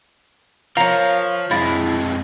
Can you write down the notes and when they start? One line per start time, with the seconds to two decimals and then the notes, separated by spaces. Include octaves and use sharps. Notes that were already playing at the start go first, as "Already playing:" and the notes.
0.77 F3 A#4 C#5 F5 A#5
1.51 F2 G#3 E4 A6